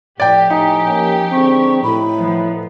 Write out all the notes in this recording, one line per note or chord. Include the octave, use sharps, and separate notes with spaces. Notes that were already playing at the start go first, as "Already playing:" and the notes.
A2 F3 G4 D5 G5
D#4 G#5
A#3 C#4
D3 G#3 C4 C#6
A2 B5
F3 B3